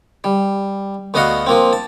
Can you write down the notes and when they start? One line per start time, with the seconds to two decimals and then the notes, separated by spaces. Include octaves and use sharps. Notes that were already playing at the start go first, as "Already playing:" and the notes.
0.24 G3
1.14 D2 B3 F#4 D#5 F5 F#5
1.47 F3 A#3 C4
1.73 A5